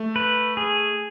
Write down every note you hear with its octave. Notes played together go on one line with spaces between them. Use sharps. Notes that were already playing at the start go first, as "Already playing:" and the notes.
Already playing: A3
B4
G#4